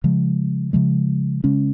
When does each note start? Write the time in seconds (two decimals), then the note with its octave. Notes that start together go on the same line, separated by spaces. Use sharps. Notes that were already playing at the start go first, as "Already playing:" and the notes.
0.04 C#3 F3 G#3
0.73 C#3 F3 G#3
1.44 C#3 G#3 C#4